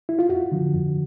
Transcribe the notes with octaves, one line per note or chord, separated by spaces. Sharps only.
E4
F4
F2 F#4
D3 F3
F2